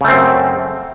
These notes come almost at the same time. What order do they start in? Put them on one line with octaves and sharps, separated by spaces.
C#3 A3 C4 F#2